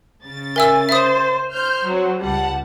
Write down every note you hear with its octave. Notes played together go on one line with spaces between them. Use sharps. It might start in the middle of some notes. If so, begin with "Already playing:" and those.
C#3 A6
A#4 E5 G#5 E6
C5 E5 D#6
C5 F6 G6
F#3 C4
C#2 G3 F#5 A5